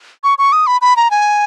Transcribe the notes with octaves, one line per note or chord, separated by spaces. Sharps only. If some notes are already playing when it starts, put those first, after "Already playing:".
C#6
C#6
D#6
B5
B5
A#5
G#5